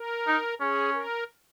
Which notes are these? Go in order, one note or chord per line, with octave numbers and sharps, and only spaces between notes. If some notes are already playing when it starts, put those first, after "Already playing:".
Already playing: A#4
D#4
C#4 G#4
A#4